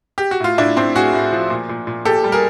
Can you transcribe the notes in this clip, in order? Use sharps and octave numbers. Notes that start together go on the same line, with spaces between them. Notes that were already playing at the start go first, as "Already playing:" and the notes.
G4
F#4
A2 F4
A2 D4 E4
A2 C4 D4
A2 F#4 G#4
A2
F3
A#2
A#2
A#2
A#2 G4 A4
G3
G#4 A#4